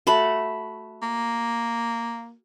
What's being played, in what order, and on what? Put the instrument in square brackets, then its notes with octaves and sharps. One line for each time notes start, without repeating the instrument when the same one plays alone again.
[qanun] A3 F#4 [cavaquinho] A5 B5
[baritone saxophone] A#3